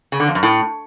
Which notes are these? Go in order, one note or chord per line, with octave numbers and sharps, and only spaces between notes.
C#3
D3
F2
F#2
A2